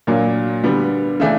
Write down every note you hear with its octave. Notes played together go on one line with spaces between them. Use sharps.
A#2 F#3 A#3 D4
D3 G3 B3
C#3 E3 A3 D4